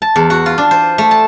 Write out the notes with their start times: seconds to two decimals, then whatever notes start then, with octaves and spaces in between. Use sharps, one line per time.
0.02 A5
0.16 E2
0.30 F#4
0.46 F4
0.58 D4
0.71 C5
0.98 A3
1.11 A5